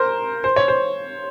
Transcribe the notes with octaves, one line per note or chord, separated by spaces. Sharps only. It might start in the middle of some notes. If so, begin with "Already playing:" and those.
Already playing: A#4 C5
C5
C#5
C5